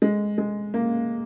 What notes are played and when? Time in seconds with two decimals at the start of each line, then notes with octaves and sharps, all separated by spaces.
0.02 G#3
0.38 G#3
0.74 A#3